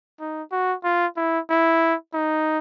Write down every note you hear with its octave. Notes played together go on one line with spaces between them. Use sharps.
D#4
F#4
F4
E4
E4
D#4